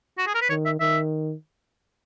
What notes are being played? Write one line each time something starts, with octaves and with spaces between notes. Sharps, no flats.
F#4
G#4
A#4
B4
D#3 C#5
E5
D#3 E5